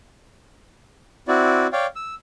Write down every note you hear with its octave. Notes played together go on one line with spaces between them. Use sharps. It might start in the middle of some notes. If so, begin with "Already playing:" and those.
C4 E4 F#4 D5
C#5 D5 F5 G5
E6